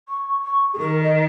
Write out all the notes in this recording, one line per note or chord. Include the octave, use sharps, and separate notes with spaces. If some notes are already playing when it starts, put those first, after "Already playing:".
C#6
C#6
G#4
D#3 A#4
D#5